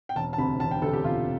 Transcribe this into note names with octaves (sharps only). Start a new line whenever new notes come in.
G5
E1 A5
A5
D2 C3 B5
E1 A5
G5
D2 C3 A4
G4
E1 F4